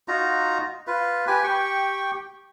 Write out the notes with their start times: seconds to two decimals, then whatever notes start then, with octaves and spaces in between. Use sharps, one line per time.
0.08 D#4 F4 F#4 A#5
0.87 F4 B4
1.27 G4 B4 G#5
1.44 G4 G5 C#6